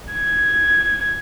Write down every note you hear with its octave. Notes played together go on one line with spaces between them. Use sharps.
G#6